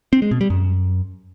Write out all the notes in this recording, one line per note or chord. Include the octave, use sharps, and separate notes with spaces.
C4
G#3
B2
G3
F#2